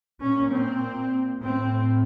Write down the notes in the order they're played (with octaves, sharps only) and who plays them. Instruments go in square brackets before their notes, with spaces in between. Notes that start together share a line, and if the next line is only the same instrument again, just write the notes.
[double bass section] A#2 C#4
C4
A2 C4